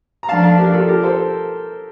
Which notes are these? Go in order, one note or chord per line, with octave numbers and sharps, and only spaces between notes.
A#5
F3 A3 D4 F5 A5
F5 A5
G4 A#4
F4 A4
G4 A#4
A4 C5